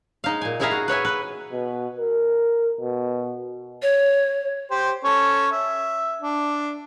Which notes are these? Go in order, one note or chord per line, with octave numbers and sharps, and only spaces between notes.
G#3 D#4 F5
A#2 G#5
G#3 E4 G#4 E5 F5 A#5
F#4
B4 C#5 E5 G#5
B4
B2
A#4
B2
C#5
G4 C5
C#4 A4 C#5
E5
D4